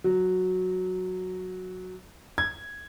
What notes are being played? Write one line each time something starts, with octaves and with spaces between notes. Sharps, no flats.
F#3
G#6